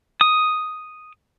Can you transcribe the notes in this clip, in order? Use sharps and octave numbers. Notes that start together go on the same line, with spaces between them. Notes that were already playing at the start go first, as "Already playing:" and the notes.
D#6